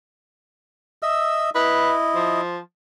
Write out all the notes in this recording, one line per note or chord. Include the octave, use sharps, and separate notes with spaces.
D#5 E5 E6
E4 B4 D#5
F3